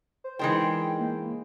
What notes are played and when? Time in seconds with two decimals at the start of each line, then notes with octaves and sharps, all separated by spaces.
0.24 C5
0.39 E3 G#3 D4 D#4 A#4 C5 G5
0.99 A#3